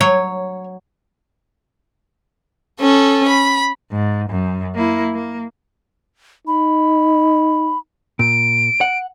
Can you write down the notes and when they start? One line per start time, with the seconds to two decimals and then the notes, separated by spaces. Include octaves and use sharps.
0.01 F#3 C#5
2.81 C#4 A4
3.29 B5
3.91 G#2
4.29 F#2
4.75 A#3 E4
5.14 A#3
6.47 D#4 B5
8.19 A#2 D7
8.81 F#5